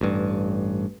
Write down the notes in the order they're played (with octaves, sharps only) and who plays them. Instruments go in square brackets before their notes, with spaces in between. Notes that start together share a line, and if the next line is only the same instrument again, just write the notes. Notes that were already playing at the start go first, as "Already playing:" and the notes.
[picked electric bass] A1 G2